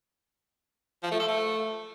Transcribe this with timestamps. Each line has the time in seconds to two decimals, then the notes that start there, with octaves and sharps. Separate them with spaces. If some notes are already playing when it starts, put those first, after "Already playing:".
1.03 F3
1.11 A3
1.20 A4
1.28 A3